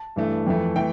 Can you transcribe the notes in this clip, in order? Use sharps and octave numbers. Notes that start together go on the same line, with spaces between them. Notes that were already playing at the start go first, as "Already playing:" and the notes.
Already playing: A5
G2 E3 A3
F2 E3 A3
E3 A3 G5